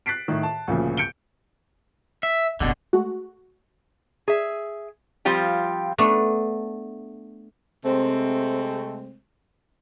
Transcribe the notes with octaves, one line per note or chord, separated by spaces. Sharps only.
F#6 A6 B6 C7 D7
A2 D#3
A5
D2 A#2 C#3 F3
G6 C#7 D7 G7
E5
F#1 B2 D3 B3
G#3 A3 F#4
G#4 E5
F3 G3 C4 F4 G4
A3 B3 D4
C3 G#3 A3 C4